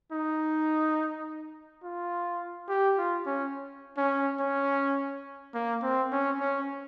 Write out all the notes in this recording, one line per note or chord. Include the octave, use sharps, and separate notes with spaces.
D#4
F4
G4
F4
C#4
C#4
C#4
A#3
C4
C#4
C#4